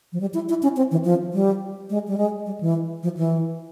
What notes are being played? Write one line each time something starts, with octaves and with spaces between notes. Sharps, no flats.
F3
G3
E4
E4
C#4
C4
E3
F3
G3
G#3
G3
G#3
G3
E3
F3
E3